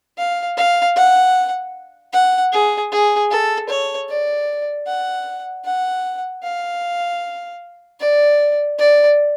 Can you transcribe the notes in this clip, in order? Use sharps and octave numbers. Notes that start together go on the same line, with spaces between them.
F5
F5
F#5
F#5
G#4
G#4
A4
C#5
D5
F#5
F#5
F5
D5
D5